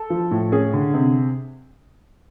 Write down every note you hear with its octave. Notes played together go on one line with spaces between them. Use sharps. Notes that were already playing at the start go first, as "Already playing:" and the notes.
Already playing: A4
F3
A2
C#4 G#4
D3
C3